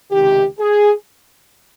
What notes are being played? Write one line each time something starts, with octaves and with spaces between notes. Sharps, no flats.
C#2 C3 D#3 G4
G#4